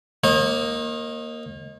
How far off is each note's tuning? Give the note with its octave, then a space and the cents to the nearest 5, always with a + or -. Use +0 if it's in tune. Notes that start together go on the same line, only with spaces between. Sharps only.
A#3 +0 D#4 +0 C#5 -45